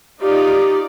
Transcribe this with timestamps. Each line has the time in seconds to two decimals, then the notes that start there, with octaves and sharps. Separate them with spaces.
0.21 D#4 F4 G4 D5